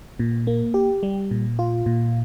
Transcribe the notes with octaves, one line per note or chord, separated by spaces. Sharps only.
A#2
A#3
G4
G3
A#2
F4
A#2